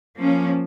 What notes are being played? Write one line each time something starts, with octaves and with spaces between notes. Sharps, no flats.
F3 A#3 C#4